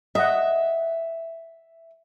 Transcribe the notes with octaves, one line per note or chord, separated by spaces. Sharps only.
D#5 E5 F#5